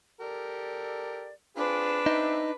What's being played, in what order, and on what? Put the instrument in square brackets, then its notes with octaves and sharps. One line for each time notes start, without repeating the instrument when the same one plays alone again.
[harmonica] G4 A4 A#4 [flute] D5
[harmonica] C4 F4 G#4 [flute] D4 [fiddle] B4
[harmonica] C4 E5 [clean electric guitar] D#4